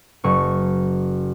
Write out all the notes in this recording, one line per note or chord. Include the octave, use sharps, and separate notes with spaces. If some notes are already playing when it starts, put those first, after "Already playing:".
F#1 C#6